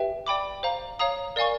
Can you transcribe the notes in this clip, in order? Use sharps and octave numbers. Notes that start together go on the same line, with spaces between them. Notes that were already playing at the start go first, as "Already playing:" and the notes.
Already playing: G4 B4 E5 G5
D5 G5 B5 D6
C5 F5 A#5
C#5 F5 A#5 D#6
A#4 D5 F5 G#5 C#6